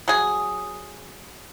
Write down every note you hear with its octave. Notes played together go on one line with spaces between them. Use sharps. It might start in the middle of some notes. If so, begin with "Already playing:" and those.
F#3 G#4